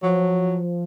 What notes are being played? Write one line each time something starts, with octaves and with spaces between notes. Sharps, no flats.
F3 F#3